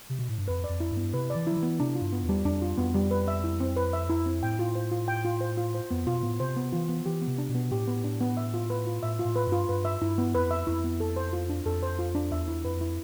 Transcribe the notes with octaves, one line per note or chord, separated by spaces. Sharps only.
C3
B2
A2
G2
F2 B4
D5
F2
E4
G2
B3
C3 B4
D5
E3
F3 E4
E3
B3
C3 D4
F4
G2
B3
E2
G3
F2 D4
F4
F2 B3
G3
B4
E5
E4
C4
B4
E5
E4
C4
A2 G5
F4
C5
F4
G5
F4
C5
F4
C5
F2 B3
B2 F4
A2 B3
C3 C5
B3
E3 F4
B3
E3 G4
B3
C3
D4
B2
B3
A2 G4
B3
D4
B3
E5
F4
B4
F4
A2 E5
F4
A2
B4
G2
F4
G2 B4
E5
G2 E4
B3
F2 B4
E5
F2 E4
B3
A4
C5
F4
D4
F2 A4
C5
F4
D4
E2 E5
E4
F2 B4
E4